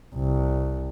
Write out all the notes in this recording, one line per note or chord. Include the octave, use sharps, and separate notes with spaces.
C2